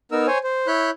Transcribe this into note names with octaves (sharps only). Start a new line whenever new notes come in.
B3 D#4 A#4 E6
C5 C#5 G#5
C5
E4 C#5 B5 F#6 G6